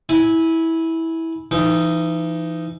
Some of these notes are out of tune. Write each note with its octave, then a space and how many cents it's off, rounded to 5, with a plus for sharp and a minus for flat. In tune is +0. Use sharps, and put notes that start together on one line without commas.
E4 -15 G#5 +0
E3 +35 D#4 +0